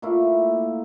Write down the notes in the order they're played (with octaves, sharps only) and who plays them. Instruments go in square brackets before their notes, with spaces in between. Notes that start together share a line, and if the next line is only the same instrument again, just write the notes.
[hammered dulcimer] A#2 A3 A#3 E4